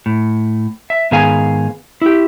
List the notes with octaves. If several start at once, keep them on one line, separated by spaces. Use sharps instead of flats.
A2
E5
G#2 D#3 B3 G#4 F5 G#5
E4 G4